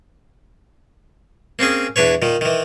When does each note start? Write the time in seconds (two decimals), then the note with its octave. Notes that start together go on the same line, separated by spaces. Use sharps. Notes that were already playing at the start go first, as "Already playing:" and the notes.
1.59 A#3 C4 C#4 G#4
1.96 E2 D4 B4 C#5
2.22 A#2 D#3
2.41 D#3 E3